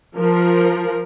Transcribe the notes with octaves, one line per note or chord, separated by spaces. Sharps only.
F3 A#4